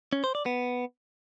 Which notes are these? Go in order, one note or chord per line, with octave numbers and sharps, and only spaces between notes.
C#4
C5
D5
B3